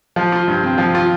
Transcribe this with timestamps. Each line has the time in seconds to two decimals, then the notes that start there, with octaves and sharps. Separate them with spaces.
0.16 F3
0.32 F4
0.48 G2
0.63 C4
0.78 F3
0.95 F4